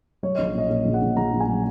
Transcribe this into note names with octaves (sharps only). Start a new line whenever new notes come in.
F#3 C#5
A#1 D#5
C#5
A#2 D#5
A#2 D#5
A#1
F#5
A#1
A#1 A#5
A#1
G#5
F#3